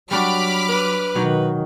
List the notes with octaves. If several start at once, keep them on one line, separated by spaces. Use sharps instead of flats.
F#3 G3 D4 F#4 B5 D6 F6
B4
B2 D#3 F#3 D#4 F#4